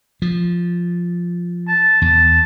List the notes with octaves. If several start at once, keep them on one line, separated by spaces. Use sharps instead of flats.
F3
A5
E2 A5